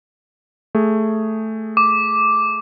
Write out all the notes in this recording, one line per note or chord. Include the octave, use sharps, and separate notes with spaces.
A3 G#4
D6